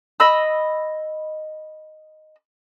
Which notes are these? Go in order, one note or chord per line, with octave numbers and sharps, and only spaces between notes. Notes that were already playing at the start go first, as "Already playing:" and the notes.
D#5 B5 E6